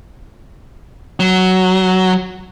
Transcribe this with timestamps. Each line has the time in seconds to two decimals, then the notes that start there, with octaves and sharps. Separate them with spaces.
1.20 F#3